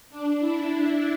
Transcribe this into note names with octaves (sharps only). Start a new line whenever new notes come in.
D4
E4